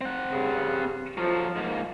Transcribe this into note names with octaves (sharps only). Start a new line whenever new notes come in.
C4 F#5
G2 C#3
F3 F#3 A4
G#2 A#3